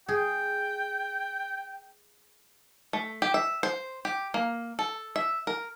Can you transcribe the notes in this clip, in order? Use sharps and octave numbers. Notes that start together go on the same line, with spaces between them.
G#4 G5
A3
G4
E5
C5
G4
A#3
A4
E5
A#4